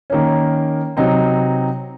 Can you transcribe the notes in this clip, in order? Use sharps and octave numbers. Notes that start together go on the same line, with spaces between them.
D#3 A#3 C#4
C3 F#3 C4 D#4